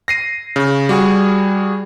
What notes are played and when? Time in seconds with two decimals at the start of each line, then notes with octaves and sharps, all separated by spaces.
0.08 A#6 C7 D#7
0.56 C#3
0.89 G3 F#4 G#4